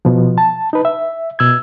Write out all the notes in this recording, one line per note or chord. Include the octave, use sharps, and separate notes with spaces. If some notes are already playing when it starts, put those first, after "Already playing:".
B2 F3
A5
D#4 B4
E5
B2 E6 G#6